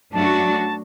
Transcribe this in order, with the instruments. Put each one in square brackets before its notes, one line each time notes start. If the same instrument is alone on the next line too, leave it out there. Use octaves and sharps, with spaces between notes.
[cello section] F#2 F#3 A3 D4 F#4 [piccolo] A5